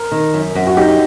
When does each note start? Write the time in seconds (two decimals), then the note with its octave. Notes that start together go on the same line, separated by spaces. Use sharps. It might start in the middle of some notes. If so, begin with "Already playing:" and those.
Already playing: A#4
0.12 D#3
0.34 F#2
0.55 F#2
0.67 F#4
0.77 D#4 G4